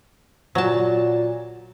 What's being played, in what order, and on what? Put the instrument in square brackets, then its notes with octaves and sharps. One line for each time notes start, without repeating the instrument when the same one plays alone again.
[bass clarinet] A#2 [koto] F#3 A5